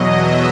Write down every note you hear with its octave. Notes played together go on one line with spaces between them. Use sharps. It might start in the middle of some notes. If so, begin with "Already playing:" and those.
Already playing: E2 B2 F#3 D#5
E5